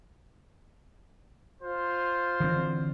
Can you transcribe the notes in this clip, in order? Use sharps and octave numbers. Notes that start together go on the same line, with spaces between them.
F4 C5
D3 E3 C4